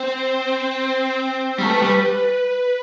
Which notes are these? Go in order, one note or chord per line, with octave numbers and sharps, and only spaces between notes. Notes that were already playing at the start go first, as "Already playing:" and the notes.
Already playing: C4 C5
G3
A3 B4
G3